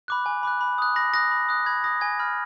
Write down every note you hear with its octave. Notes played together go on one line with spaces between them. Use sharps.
B5 D6 F#6
G#5
B5 D6 F#6
B5
D#6 F#6
B5 A#6
D#6 F#6 A#6
B5
D#6 F#6
B5 G#6
D#6 F#6 A#6
G#5 G#6
B5 F6